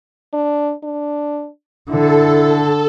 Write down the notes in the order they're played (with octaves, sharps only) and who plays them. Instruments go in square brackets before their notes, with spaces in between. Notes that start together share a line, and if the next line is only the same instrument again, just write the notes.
[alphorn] D4
D4
[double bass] D3 [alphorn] E4 [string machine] A4